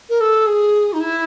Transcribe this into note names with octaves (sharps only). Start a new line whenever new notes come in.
A#4
A4
G#4
D#4
E4